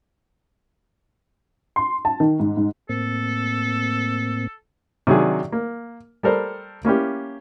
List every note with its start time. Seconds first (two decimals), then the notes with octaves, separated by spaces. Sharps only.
1.76 C6
2.05 A5
2.20 D#3
2.40 G#2
2.57 G#2
2.89 A2 A#3 C4 A4
5.07 C3 D#3 F#3 D4 G#4
5.52 A#3
6.23 G3 A4 A#4 C5
6.85 A#3 C#4 E4 G4